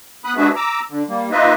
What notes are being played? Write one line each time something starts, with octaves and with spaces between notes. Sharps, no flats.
B3 B5 D#6 F#6
G#3 D4 F#4 G#4 B4 E5
A#5 D6 E6
D3
G3 A#3
A#3 D#4 F4 B4 D#5 E5